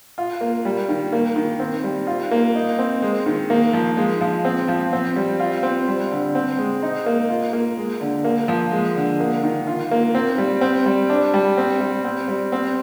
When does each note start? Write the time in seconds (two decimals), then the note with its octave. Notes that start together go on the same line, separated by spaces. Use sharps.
0.18 F4
0.41 A#3
0.65 G3
0.89 D#3
1.12 A#3
1.36 D#3
1.60 C4
1.84 G3
2.07 F4
2.31 A#3
2.55 D#4
2.79 C4
3.02 G#3
3.26 D#3
3.50 A#3
3.73 F3
3.97 G#3
4.21 F3
4.45 C4
4.68 F3
4.93 C4
5.16 G3
5.40 F4
5.63 C4
5.88 G3
6.11 D3
6.35 C4
6.59 G#3
6.82 D#4
7.06 A#3
7.29 F4
7.53 A#3
7.77 G#3
8.01 D3
8.24 A#3
8.48 F3
8.72 G#3
8.95 D3
9.20 A#3
9.43 D#3
9.67 F4
9.91 A#3
10.15 C4
10.38 G3
10.61 C4
10.86 G3
11.10 D4
11.34 G3
11.57 C4
11.80 G3
12.04 C4
12.28 G3
12.52 C4